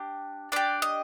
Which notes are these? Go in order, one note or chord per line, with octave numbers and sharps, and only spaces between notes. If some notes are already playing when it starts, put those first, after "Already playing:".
Already playing: D4 G4
D4 G4 D5
D#5